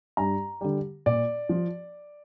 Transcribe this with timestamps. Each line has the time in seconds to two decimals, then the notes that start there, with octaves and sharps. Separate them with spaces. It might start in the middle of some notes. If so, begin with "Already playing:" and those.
0.17 G2 A#5
0.61 D3 G3
1.06 A#2 D5
1.49 F3